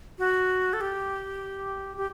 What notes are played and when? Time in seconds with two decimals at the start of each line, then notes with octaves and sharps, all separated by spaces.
0.18 F#4
0.73 A4
0.81 G4
1.97 G4